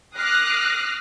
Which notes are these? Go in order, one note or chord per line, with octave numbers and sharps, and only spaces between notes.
D6 D#6 F6 F#6 A#6 C7